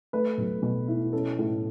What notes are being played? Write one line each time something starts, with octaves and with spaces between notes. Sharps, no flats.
A3 B4
B1
B2
E4
C#4 A4
A2